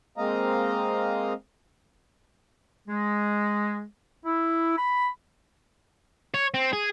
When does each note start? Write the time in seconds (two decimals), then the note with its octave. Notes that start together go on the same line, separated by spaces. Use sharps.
0.18 G#3 A#3 C4 D#5 F5 A#5
2.88 G#3
4.25 E4
4.78 B5
6.34 C#5
6.54 C4
6.73 G#4